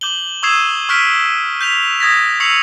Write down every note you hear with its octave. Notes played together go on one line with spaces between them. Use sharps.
D6 G6 F#7 G7
C#6 D#6 E6 G#6 C7 E7
C#6 F6 F#6 B6 D7
G6 B6 F7
D#6 G#6 A#6 B6
C#6 E6 C7 C#7 F7 F#7